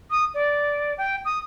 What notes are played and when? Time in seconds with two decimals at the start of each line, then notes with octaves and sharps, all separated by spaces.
0.11 D#6
0.34 D5
0.98 G5
1.25 D#6